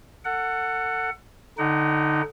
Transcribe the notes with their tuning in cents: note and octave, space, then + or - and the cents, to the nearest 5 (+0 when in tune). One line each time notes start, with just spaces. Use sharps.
A4 +30 F#5 +0
D3 +0 D#4 -5 F#5 +45